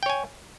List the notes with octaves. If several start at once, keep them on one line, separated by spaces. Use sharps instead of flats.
C#5 G5 G#5